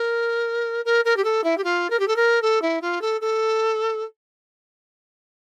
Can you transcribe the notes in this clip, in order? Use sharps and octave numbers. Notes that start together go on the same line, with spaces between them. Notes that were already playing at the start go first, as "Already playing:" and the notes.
Already playing: A#4
A#4
A#4
G4
A4
E4
G4
F4
A#4
G4
A4
A#4
A4
E4
F4
A4
A4